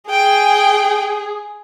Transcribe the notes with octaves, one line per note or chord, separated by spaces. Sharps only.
G#4 G5